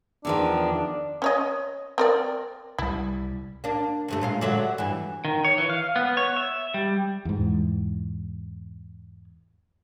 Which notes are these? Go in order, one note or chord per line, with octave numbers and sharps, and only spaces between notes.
E2 D#3 F3 D4
C#4 C#5 D#5
C4 A#4 D5
C2 G3 E4
A#3 D4
D2 G2 A3
A#2 G#3 F5
D3 F#3 E5
G2 E3
D#3
C#5
E3
F5
B3
C#5
E5
G3
E2 G#2